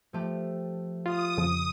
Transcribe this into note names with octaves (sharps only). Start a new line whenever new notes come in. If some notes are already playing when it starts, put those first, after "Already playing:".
F3 A3 G4
F4 D#6
F2 C#3 F3